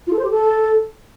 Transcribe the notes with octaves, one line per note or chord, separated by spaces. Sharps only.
F4
A4
C5
G4
A4